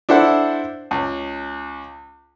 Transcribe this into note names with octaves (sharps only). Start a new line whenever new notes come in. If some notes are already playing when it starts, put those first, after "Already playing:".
D4 E4 A4 C5 F#5
C#2